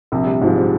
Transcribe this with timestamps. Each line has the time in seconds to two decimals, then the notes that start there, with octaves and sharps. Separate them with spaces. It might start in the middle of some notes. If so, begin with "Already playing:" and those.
0.12 A#1 C3
0.27 G3
0.41 G#2 F3 G#3
0.57 G3